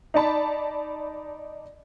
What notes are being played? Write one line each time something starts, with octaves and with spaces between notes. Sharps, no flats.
D#4 D5 A5 B5